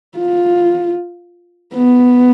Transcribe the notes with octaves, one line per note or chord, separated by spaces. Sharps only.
F4
B3